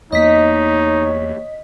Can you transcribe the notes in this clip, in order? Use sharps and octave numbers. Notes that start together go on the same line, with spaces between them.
E2 A#3 D#4 C#5 D#5 B6